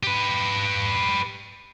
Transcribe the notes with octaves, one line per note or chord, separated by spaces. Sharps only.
G4 B4